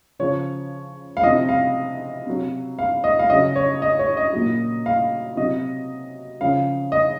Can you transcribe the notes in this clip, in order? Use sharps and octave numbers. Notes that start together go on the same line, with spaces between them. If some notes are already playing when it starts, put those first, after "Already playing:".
C#3 F3 C#5
F5
C3 F3 D#5
F5
C3 F#3
F5
D#5
F5
C#3 F#3 D#5
C#5
D#5
C#5
D#5
A#2 F#3
F5
C3 F#3 D#5
C#3 F3 F5
D#5